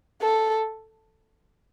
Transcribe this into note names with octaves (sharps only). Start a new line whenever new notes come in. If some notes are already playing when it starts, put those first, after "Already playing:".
A4